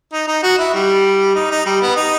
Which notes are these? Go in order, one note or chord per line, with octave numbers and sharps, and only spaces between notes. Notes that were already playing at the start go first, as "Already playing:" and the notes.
D#4
D#4
F#4
E4
G3
D#4
D#4
G3
B3
D#4